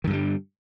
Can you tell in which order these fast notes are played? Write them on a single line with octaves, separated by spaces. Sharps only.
D#3 G2 D3 G3